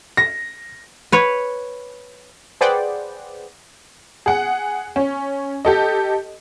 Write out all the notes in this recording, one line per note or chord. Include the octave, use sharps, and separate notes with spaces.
A#6
B4 C#5
G#4 B4 C5 D5 F#5 G5
G#4 F#5
C#4
G4 A4 D#5